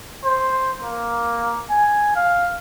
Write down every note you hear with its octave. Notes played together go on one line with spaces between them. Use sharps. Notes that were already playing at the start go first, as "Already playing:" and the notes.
C5
A#3
G#5
F5